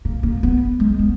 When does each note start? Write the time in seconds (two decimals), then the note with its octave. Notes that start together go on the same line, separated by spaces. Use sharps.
0.05 A#3
0.23 A#3
0.43 B3
0.80 G#3
0.99 B3